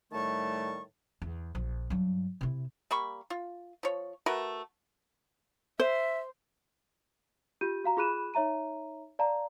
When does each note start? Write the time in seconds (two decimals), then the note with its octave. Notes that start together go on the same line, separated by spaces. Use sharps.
0.12 A2 D#3 G3 A3 A5 C#6
1.22 E2
1.55 A#1 F3
1.90 G2 F#3
2.41 C3 E4
2.91 G3 A#3 B5 C#6
3.30 F4
3.83 F3 C#5
4.26 A3 F#4 A#4 B4
5.80 C5 E5
7.61 F4 G4 G6 D#7
7.84 F#4 F5 A#5
7.97 F4 G#4 B5 F#6 D#7 E7
8.34 D#4 C#5 E5 A#5 D#7
9.19 D5 F5 A5 A#5